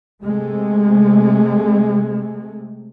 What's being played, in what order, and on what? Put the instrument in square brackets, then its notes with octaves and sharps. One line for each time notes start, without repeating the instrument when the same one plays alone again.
[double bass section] C3 G#3 A3